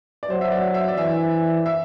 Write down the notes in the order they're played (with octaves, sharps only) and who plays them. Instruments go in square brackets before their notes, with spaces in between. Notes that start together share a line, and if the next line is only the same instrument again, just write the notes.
[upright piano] D5
[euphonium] F#3 [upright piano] C5
[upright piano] E5
D5
E5
D5
[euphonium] E3 [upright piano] E5
[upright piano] E5